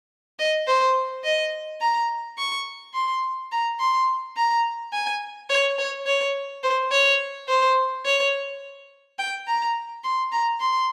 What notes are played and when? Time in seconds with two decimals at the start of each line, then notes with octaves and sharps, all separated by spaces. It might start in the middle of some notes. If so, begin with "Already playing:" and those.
0.39 D#5
0.67 C5
1.24 D#5
1.81 A#5
2.38 C#6
2.94 C6
3.52 A#5
3.80 C6
4.37 A#5
4.93 G#5
5.50 C#5
5.78 C#5
6.07 C#5
6.64 C5
6.92 C#5
7.49 C5
8.06 C#5
9.19 G5
9.48 A#5
10.04 C6
10.32 A#5
10.60 C6